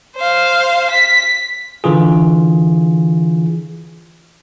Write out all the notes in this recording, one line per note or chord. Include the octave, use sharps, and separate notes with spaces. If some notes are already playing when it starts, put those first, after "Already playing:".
C5 F5
B6
D3 E3 F4 G#4